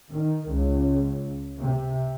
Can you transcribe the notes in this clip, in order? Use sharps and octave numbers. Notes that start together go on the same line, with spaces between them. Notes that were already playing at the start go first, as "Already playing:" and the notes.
D#3
C#2
C3